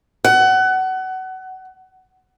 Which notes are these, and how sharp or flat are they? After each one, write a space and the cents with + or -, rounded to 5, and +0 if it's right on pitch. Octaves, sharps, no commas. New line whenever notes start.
F#5 +25